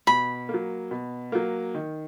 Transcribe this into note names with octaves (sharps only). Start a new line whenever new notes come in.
B2 B5
A#3
F#3
B2
F#3 A#3
D#3